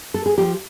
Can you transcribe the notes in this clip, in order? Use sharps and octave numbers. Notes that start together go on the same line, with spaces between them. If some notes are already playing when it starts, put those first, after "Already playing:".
A4
G#4
F3 G4